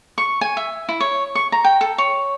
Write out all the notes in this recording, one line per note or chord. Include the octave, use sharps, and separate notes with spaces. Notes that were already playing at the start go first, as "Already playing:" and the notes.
C#6
G#5
E5
E4
C#5
C#6
A#5
G5
A4
C#5